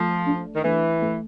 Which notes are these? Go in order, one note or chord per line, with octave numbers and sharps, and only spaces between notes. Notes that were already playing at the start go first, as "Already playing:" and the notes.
Already playing: F3 A3
D4
D#3
E3 A3
A3